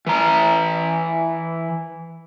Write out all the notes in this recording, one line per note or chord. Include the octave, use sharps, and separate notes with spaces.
E3 A#5